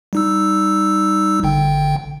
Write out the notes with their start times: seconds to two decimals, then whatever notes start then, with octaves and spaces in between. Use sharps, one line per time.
0.13 G3 D#4 E6
1.43 G#1 D3 G5